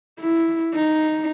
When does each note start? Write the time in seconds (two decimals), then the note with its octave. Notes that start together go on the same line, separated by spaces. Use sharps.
0.20 E4
0.74 D#4